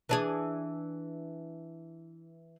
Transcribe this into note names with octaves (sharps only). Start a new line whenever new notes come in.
E3 D4 G#4